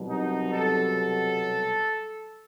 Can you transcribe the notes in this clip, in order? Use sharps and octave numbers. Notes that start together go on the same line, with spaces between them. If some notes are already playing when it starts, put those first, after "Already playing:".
Already playing: C2 B2 F#3
D#4
A4